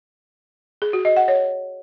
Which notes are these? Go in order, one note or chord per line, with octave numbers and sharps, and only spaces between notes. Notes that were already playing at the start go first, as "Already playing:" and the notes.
G#4
F#4
D#5
F#5
C#5